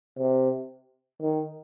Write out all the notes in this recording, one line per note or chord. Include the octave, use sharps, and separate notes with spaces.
C3
D#3